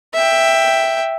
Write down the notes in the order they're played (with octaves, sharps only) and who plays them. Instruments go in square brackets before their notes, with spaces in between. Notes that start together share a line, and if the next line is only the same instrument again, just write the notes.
[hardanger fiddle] E5 G5